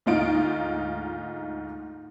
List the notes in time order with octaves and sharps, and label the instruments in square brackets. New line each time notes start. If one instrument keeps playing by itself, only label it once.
[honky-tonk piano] D2 G#2 D#4 F4 D7